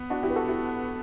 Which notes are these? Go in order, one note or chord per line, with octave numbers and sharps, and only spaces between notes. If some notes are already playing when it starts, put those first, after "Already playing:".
Already playing: B3
D4 F#4
E4 G4
B4
F#4 A4
E4 G4